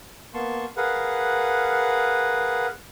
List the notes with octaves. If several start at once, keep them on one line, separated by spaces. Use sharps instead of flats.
A#3 B3 A5 C6 C#6
G#4 A#4 B4 F5 F#5